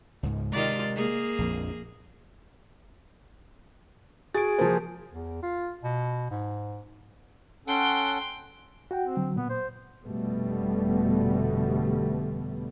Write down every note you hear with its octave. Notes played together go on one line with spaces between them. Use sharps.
C#2 G#2
C3 D#3 G#3 F4 D5
A#3 G#4
A#1 F2
F#4 G#4 A6 D7
F3 A#3 C5
E2
F4
B2
G#2
C#4 A4 F#5 G5 C6
F#4 F#5 G5
C4
D3 F#3
A#2 B3
C5
F1 B2 D3 G3 A3 B3